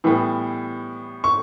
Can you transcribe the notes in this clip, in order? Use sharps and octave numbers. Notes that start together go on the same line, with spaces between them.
A2 E3 G3 B3
C#6